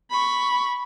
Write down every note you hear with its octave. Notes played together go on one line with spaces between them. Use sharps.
B5 C#6